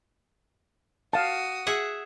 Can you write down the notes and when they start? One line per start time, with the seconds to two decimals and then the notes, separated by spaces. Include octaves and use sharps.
1.13 F#4 F5 A5 D#6
1.67 G#4 E5 F#5